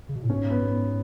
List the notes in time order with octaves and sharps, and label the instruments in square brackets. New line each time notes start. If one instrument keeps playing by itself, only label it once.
[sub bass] C#3
B2
A2
[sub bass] G#2 [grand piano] C#4
[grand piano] B3